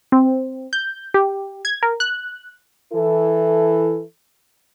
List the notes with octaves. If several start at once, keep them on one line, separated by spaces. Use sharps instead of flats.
C4
G6
G4
G#6
A#4
F#6
E3 E4 A4